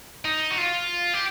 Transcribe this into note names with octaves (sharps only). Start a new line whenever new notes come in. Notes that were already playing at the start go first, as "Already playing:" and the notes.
D#4
F#4
F4
G4